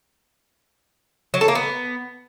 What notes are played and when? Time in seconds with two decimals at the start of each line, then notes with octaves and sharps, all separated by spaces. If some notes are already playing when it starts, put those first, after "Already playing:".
1.34 F#3
1.41 A4
1.48 A#3
1.55 B3